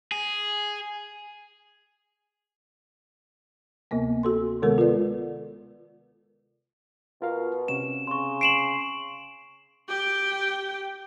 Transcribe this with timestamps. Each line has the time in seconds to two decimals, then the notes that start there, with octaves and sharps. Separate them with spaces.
0.12 G#4
3.91 D2 C3 A#3 B3
4.23 F#4 A4 C6
4.63 C3 D#3 G#3 B3 A4 A#4
4.78 F4 A4 B4 D5
7.22 B2 F4 A#4 F5
7.68 C3 C#4 E7
8.07 C#3 C6 C#6
8.41 C7 D7 E7 F#7
9.89 G4 G5